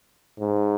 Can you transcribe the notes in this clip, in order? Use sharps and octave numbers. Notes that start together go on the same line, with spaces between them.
G#2